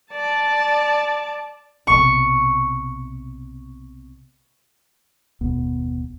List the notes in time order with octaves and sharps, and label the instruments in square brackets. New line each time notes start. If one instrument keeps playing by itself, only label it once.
[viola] D5 A5
[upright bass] B1 C3 [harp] C#6
[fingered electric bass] F#1 D#2 B2 B3